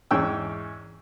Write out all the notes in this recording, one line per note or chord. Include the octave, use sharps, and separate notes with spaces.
E2 G#2 C#4 G5 E6